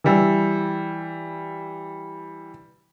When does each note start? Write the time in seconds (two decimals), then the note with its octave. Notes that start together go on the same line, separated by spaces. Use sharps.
0.04 E3 G3 E6